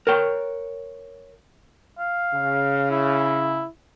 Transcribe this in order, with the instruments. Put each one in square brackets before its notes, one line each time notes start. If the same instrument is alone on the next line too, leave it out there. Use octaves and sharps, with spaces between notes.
[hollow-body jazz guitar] A#4 C#5 G5
[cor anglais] F5
[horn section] C#3
[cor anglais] E4